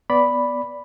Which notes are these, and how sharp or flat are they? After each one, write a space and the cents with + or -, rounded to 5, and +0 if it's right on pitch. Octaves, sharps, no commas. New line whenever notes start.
B3 +0 D5 -10 B5 +0